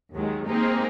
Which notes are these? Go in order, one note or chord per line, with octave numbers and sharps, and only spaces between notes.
D#2 D#3 F#3 G#3
G#3 A#3 C4 D#4 G4 G#4